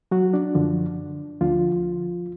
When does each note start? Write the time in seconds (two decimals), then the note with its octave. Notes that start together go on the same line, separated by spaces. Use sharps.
0.11 F#3 F#4
0.34 D4
0.55 F#2 D3 F3
1.41 D2 D3 F3 F4